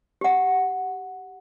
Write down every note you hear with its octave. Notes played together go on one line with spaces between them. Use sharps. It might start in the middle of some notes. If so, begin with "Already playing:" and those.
G4 F#5